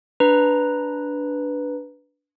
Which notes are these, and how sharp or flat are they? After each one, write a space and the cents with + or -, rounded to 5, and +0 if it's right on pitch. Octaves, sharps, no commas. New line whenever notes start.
D4 -10 B4 +0 A#5 +0